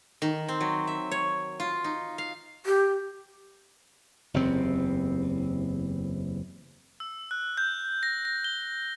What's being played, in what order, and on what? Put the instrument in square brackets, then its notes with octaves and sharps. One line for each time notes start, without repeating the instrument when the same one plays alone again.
[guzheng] D#3
C4
F#3
E5
C#5
F4
D#4
F5
[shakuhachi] G4
[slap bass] F#1 E2 C3 C4
[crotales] E6
F#6
G6
A#6
A#6
G7